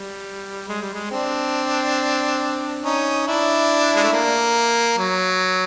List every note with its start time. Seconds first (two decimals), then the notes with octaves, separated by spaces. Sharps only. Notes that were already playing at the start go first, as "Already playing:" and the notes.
Already playing: G3
0.69 G#3
0.82 G3
0.94 G#3
1.11 C4 D4
2.84 C#4 D#4
3.27 D4 E4
3.96 G#3
4.04 A3
4.12 A#3
4.98 F#3